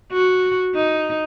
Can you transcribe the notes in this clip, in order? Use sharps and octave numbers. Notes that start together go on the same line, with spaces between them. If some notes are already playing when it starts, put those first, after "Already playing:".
F#4
D#4